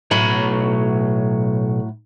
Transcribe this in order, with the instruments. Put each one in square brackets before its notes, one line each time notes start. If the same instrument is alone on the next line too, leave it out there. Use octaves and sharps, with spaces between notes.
[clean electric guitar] B1 C#5 B5 [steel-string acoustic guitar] A2 F#3